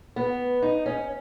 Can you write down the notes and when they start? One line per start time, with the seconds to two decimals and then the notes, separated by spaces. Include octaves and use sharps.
0.16 B3
0.62 D#4
0.86 C#4